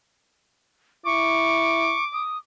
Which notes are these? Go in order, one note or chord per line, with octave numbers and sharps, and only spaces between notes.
E4 C#6 D6
D#6